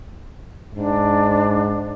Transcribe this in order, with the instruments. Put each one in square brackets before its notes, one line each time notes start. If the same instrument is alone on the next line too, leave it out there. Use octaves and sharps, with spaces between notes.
[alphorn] G#2 [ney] D4